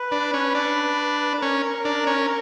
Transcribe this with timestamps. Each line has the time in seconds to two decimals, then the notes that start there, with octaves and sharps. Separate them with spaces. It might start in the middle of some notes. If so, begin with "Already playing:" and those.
Already playing: B4
0.12 D4
0.34 C#4
0.55 D4
1.41 C#4 A#4
1.85 D4
2.07 C#4